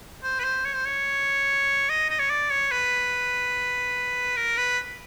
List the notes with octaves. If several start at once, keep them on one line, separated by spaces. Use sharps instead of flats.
C5
B4
C5
C#5
C5
C#5
D#5
D#5
C#5
D5
C#5
B4
A#4
B4